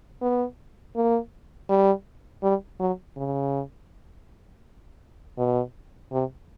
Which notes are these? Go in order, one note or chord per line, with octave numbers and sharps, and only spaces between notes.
B3
A#3
G3
G3
F#3
C#3
B2
C3